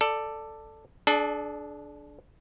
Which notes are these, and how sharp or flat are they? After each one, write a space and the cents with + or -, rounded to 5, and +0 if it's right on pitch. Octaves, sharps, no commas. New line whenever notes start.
A4 +5 D5 +10
D4 +0 G#4 +45 D5 +35